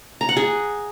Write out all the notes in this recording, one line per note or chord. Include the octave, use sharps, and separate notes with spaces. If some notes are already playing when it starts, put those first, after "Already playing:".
A#5
F#5
G#4